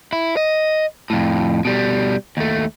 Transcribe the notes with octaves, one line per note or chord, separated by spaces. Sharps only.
E4
D#5
F2 A2
B2 G3
D#2 A3